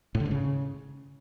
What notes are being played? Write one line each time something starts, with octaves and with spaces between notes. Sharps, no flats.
A2
D3
G#2
C#3